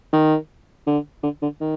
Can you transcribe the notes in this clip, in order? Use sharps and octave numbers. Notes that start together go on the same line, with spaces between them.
D#3
D3
D3
D3
D#3